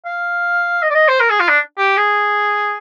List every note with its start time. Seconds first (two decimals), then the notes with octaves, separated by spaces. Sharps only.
0.06 F5
0.83 D#5
0.90 D5
0.95 D#5
1.08 C5
1.20 A#4
1.30 G#4
1.40 F4
1.49 D4
1.78 G4
1.97 G#4